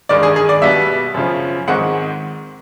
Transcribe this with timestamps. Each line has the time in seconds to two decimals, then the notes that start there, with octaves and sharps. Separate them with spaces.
0.09 G2 D#3 G#3 D5
0.23 G#4
0.36 G#4
0.49 D5
0.62 B2 G3 B3 E5
1.14 F#2 C#3 F3
1.67 G#2 D#3 G#3 C4 F#5